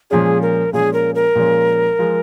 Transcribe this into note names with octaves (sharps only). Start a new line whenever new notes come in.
A#2 F3 G#3 C#4 G#4
A#4
A#2 F3 G#3 C#4 G#4
A#4
A#4
A#2 F3 G#3 C#4
F3 G#3